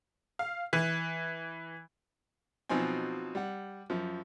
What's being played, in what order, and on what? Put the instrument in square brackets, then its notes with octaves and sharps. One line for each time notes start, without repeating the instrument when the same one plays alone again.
[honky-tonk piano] F5
E3
[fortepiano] B2 F3 F#3 C4 D#4 G#5
G3 F#5
F#2 F3